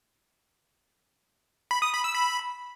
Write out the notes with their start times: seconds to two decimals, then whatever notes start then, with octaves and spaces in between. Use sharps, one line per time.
1.71 B5
1.82 D#6
1.93 B5
2.04 E6
2.15 B5